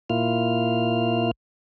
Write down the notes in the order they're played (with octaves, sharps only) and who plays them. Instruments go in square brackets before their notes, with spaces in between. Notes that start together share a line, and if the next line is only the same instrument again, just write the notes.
[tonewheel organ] A#2 A#3 E4 F4 F6